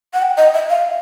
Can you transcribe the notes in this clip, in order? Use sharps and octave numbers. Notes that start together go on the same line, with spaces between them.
F#5
G5
D#5
E5
F5